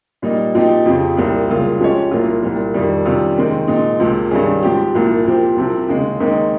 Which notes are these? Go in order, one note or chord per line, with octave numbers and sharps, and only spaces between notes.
A#2 G3 A#3 D#4
A#2 F3 C4 D#4 G4
F2 C#3 F3 C4 G4
C2 A#2 G3 C4
C#2 C#3 G3 A#3 F4
F3 G#3 C#4 G4 C#5
C2 A#2 F3 A#3 F4
C2 A#2 G3
F2 D#3 G3
C3 D#3 G3 C#4 F4
D#2 D#3 G#3 C4
A#2 G#3 D#4
C#2 C3 F3 A#3
G2 D#3 G3 C#4 G#4
G#2 F3 C4 G4
C2 A#2 F3 A#3
A#2 F3 C4 G4 C5
C2 C3 F3 C4
D#2 C#3 G#3
D#2 D#3 G#3 C4 D#4